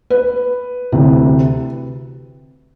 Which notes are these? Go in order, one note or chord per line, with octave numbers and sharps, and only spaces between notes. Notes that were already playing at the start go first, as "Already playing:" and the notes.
B4
D2 C3 E3